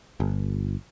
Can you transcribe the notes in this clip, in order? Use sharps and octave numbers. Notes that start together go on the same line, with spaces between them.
G1